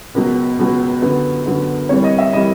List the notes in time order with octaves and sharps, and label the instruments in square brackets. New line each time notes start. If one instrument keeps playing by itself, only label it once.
[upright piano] C#2 B2 F#3 A#4
C#2 B2 F#3
F#2 D3 F#3 B3
F#2 D3 F#3 B3
C2 C3 E3 G3 A#3 C#5
D#5
E5
C3 E3 G3 A#3 D#5